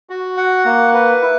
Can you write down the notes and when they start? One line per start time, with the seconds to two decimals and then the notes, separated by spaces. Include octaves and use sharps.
0.10 F#4
0.37 F#5
0.65 A#3
0.94 B4
1.22 E4